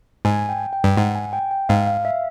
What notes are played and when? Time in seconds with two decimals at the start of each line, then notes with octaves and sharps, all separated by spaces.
0.25 G#2 G#5
0.49 G5
0.73 G5
0.84 G2
0.97 G#2 F#5
1.15 G#5
1.33 G5
1.51 G5
1.69 G#2 F5
1.87 F5
2.05 E5